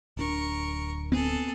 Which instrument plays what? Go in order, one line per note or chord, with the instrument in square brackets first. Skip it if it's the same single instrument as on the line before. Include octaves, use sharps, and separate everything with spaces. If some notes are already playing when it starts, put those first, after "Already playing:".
[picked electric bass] D1 C#4 D4 [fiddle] A#4 C#6
[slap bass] B3 C4 [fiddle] G#4 A4